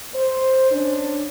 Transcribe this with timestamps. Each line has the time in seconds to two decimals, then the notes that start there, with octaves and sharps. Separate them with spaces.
0.14 C5
0.71 C#4 D4